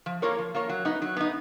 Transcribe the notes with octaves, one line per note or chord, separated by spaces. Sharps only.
F3
A#3 F4 A#4 C#5
F3
A#3 F4 A#4 C#5
F#3
B3 D#4
F#3
B3 D#4